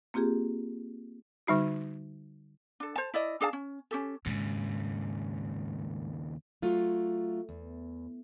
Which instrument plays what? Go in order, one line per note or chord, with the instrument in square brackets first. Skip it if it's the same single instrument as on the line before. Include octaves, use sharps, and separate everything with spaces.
[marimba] A#3 C4 F4 G4 G#4
[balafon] D3 G3 D#4 F#4
[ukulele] D4 A4
C5 A5
E4 D5 D#5
D4 G#4 F5 A5
C#4
C#4 G4 A4
[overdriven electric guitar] D#2 C#3 [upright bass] G#2
[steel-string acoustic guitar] F#3 A3 F4
E2